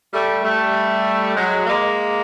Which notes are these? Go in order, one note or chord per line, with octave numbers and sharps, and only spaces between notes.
G3 A3
G3 A3
F#3 G#3
G#3 A#3